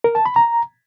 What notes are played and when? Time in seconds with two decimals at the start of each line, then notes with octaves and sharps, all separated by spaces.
0.04 A#4
0.15 A5
0.26 B5
0.36 A#5